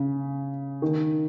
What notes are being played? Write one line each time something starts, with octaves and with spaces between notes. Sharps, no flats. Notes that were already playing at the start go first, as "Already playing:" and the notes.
Already playing: C#3
D#3